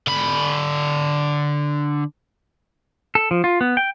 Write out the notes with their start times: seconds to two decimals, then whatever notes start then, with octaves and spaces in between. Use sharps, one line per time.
0.07 D3 B5
3.15 A4
3.31 F3
3.44 F4
3.61 B3
3.77 G5